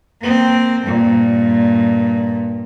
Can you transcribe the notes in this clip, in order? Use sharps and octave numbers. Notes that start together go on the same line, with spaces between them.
A#3 C4
G2 A#2